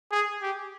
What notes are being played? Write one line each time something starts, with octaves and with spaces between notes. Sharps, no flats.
G#4
G4